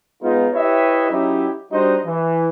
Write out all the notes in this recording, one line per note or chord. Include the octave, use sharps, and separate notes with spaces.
G#3 B3 D#4 F4
E4 G4 B4 C#5 D#5 E5
F#3 C#4 D#4 E4 G4 E5
G3 D4 D#4 F#4 C5 D#5
E3